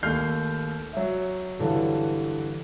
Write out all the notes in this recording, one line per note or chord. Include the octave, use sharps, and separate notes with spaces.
D#2 A3 F6 G6 C7
F#3 E5
G2 D3 E3 F#3